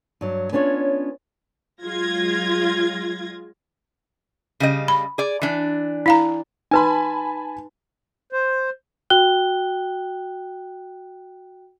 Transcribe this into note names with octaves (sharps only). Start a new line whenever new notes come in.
G2 F#3
B3 C#4 D4 F4 C#5
F#3 G#3 F4 G#6 A#6
C#3 G3 D#5
B5
G#4 D5
E3 D4
E4 F5 A#5
D#4 B4 G#5 A5 B5 C6
C5
F#4 G5 F#6 G7